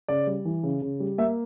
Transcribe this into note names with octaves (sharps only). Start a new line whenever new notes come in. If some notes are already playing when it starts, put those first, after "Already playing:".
C#3 D5
G3
E3
C#3
C#3
G3
A#3 E5